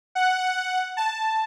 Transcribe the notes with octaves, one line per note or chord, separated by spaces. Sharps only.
F#5
A5